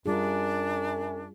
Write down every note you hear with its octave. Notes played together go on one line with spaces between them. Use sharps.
F#2 G3 D4 F4 G#4